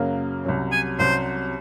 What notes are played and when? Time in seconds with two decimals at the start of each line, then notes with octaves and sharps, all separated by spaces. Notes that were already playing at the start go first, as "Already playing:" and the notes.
Already playing: F#2 C#3 F#3 A#3
0.45 C2 C3 F#3 C#4
0.72 G#5
0.99 C2 C3 F#3 C#4 C5